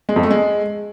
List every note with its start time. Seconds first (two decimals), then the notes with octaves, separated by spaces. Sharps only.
0.09 G#3
0.16 F2
0.23 A3
0.30 G#3